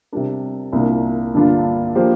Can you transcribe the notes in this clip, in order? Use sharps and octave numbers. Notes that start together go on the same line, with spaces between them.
C3 G3 D4 A#4
C2 A#2 A#3 D4
G2 D3 A#3 D4 F4
F3 A#3 G4 C5